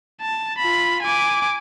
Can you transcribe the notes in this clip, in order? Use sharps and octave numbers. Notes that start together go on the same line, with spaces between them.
A5
F4 B5
G#5 D6